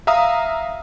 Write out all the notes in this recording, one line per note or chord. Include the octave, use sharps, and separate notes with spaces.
E5 F5 A#5 D#6